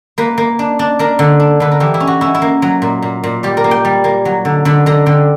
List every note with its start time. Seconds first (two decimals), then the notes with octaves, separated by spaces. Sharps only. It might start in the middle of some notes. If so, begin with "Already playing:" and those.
0.18 A#3 B4
0.38 A#3
0.59 D4
0.79 D4
0.99 D4 A#4
1.19 D3
1.40 D4
1.60 D3 B4
1.72 A#4
1.80 E3 G4
1.94 E4
2.00 C#4
2.07 F#4
2.21 C#4 E4
2.34 E4
2.42 A#3
2.62 F#3
2.82 A#2
3.02 A#2
3.24 A#2
3.43 G3 G4
3.57 A#4
3.64 A#3
3.71 G5
3.85 G3
4.04 A#3
4.25 F#3
4.45 D3
4.65 D3 B5
4.86 D3 A#5
5.06 D3 G5